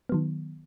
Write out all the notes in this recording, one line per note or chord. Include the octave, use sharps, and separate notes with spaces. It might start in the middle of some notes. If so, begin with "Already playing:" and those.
D#3 F#3 B3